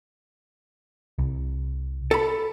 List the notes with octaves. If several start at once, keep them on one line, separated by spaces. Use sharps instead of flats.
C2
A4 B5